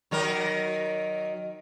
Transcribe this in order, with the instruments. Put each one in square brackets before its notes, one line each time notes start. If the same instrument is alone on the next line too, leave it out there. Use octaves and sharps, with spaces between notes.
[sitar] D#3 F#3 A#4